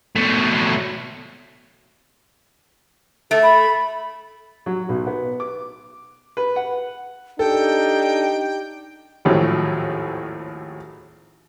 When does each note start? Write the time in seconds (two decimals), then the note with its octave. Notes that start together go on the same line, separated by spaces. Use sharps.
0.16 B2 A3
3.31 A3 A4
3.43 B5
4.66 F#3
4.89 B1
5.07 B3
5.40 D6
6.37 B4
6.56 F#5
7.39 D4 D#4 G4 A4 G5
9.25 G#1 D#2 A2 F3 F#3